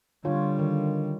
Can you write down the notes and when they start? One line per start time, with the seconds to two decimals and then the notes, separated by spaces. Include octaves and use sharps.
0.25 D3 G3 F4 C#5
0.59 D#3